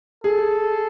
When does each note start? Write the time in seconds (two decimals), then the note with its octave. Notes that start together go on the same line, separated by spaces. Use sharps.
0.24 G#4 A4